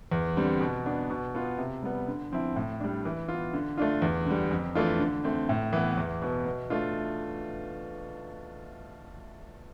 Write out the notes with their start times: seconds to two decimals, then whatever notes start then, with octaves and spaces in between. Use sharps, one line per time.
0.12 E2
0.37 D3 G3 C4
0.61 B2
0.86 B3 D4
1.10 B2
1.35 B3 F4
1.58 C3
1.83 G3 B3
2.08 D3
2.32 F3 C4 E4
2.56 A2
2.80 G3 D4
3.05 E3
3.28 B3 F4
3.53 D3
3.78 A3 D4 F4
4.02 E2
4.26 D3 G3
4.51 F2
4.75 E3 A3 D4 F4
4.99 D3
5.24 A3 C4
5.49 A2
5.73 E3 B3
5.97 E2
6.22 B2 B3
6.46 B2
6.70 A3 D4 F4